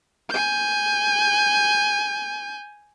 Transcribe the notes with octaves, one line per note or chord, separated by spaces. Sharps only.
G#5 G6